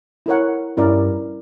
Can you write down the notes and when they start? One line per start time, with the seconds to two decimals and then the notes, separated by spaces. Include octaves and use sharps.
0.26 E4 A#4 C#5 F#5
0.77 G2 C#4 E4 A#4 D5